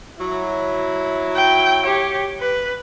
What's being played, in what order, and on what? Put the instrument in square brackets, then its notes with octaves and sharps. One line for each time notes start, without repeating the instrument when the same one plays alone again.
[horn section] F#3 E4
[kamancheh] G5
G4 C#5
B4